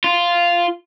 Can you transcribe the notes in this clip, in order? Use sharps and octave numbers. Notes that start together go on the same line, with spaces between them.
F4